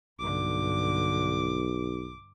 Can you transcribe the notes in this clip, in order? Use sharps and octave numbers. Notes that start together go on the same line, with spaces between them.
B1 G2 D3 D6